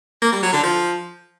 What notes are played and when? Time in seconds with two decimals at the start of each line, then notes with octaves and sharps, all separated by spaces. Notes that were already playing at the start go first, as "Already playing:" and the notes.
0.22 A#3
0.32 G3
0.42 F#3
0.53 D3
0.63 F3